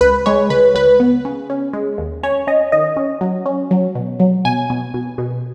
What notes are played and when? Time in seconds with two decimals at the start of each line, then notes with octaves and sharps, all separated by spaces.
0.01 C#2 B4
0.26 G#3 C#5
0.50 C#2 B4
0.75 C#2 B4
1.00 B3
1.25 C#3
1.50 C#4
1.73 G#3
1.98 D#2
2.23 C#4 C#5
2.47 C#4 D#5
2.72 D#3 D#5
2.97 C#4
3.21 F#3
3.46 C#4
3.71 F#3
3.95 B2
4.20 F#3
4.45 B2 G#5
4.70 B2
4.94 B2
5.18 B2